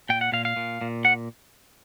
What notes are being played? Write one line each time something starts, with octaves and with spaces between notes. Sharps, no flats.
A#2 G5
F#5
A#2 F5
F5
A#2
A#2
F#5